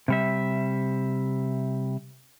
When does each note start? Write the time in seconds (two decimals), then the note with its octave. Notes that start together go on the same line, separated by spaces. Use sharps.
0.08 C3 G3 E5